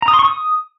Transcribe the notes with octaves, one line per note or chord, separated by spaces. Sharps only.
A#5
D#6
C6
C#6
D#6